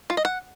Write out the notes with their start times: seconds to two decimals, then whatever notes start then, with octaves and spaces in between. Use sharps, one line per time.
0.10 F4
0.17 D#5
0.25 F#5